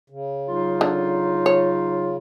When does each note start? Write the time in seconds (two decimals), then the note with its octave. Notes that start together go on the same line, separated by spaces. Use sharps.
0.10 C#3
0.48 F#3 D#4 F4
0.81 D3
1.46 C#5